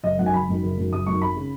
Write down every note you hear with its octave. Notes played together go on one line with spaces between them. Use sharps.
F#1 D#5
F#2 D#3 F#5
G#5
F#1 B5
F#2 D#3
F#1
F#2 D#3
F#1 D#6
F#2 D#3 C#6
G#1 B5
C#3